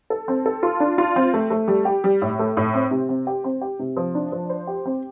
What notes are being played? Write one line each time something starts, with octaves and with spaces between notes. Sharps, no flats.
A4
C4
A4
F4
D4
F4
C4
A3
A3
G3
G4
G3
A2
A3
A2
C4
C3
C4
G4
C4
G4
C3
F3
D4
F3
C5
G4
C4